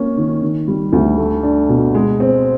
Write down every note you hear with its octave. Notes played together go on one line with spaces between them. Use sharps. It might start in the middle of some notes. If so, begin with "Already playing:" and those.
Already playing: A#3 C#4
D#3
D#3
G3
D2
A3
D4
B2
G#3
C4